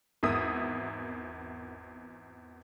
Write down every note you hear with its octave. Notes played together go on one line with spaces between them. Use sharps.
G#1 E2 A#4 E5 D#6